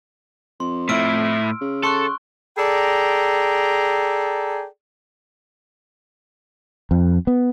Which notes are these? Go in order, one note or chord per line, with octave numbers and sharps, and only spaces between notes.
F2 C6
A2 E4 E6 F6 D7
C#3
A4 C6 C#6 F#6
G#4 A4 D5 G5 A#5
F2
B3